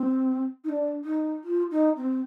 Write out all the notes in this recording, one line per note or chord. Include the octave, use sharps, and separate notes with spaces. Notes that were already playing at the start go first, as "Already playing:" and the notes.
Already playing: C4
D#4
D4
D#4
F4
D#4
C4